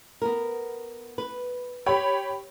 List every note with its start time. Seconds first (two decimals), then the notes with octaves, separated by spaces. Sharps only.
0.22 B3 A#4
1.18 B4
1.86 G4 C#5 B5